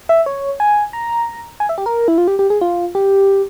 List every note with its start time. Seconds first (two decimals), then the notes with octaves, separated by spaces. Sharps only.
0.09 E5
0.26 C#5
0.60 G#5
0.93 A#5
1.60 G#5
1.69 E5
1.78 G4
1.86 A#4
2.08 E4
2.18 F4
2.28 G4
2.39 G4
2.50 G#4
2.61 F4
2.95 G4